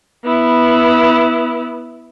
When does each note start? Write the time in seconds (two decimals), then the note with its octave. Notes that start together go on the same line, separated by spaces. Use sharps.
0.24 B3 E4